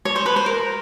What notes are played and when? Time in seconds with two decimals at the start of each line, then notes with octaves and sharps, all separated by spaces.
0.05 C#5
0.16 C5
0.26 B4
0.36 C5
0.46 A#4